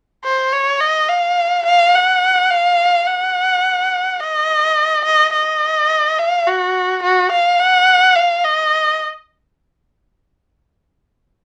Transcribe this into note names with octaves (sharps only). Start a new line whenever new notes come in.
C5
C#5
D#5
F5
F5
F#5
F5
F#5
D#5
D#5
D#5
F5
F#4
F#4
F5
F#5
F5
D#5